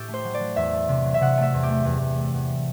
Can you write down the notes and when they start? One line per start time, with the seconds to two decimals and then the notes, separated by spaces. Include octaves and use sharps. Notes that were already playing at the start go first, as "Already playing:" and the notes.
Already playing: A2 G4 A4
0.08 A3
0.14 C5
0.24 F#3
0.34 D5
0.40 F#3
0.56 E2 E5
0.72 A3
0.88 C3
1.04 F#3
1.14 E5
1.21 C3 F#5
1.37 A3 E5
1.54 E2
1.63 G4
1.69 A3
1.85 E2
2.01 E2
2.18 A3
2.33 E2